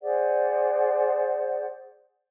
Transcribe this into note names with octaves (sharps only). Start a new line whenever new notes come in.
G#4 C5 D5 F#5